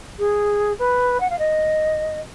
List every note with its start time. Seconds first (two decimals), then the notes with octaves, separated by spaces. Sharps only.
0.19 G#4
0.79 B4
1.20 F#5
1.30 F5
1.39 D#5